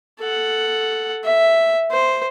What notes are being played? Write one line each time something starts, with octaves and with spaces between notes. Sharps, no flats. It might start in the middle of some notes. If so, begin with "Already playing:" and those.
A4 F#5
E5
C5